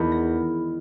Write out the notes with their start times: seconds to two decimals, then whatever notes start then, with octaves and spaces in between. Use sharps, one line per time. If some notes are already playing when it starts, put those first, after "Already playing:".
Already playing: E2 D#3 G#3 B3
0.12 A#6